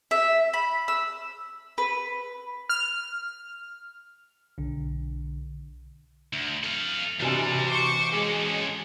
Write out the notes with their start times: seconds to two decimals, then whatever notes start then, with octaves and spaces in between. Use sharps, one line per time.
0.11 E5
0.53 B5
0.88 E6
1.78 B4
2.69 F6
4.58 B1 D3
6.33 D2
6.63 A4 F5
7.20 C3 E3 G3 D4 F#4 G#5
7.67 C5 C#6 D6
8.14 G#3 C#4 A4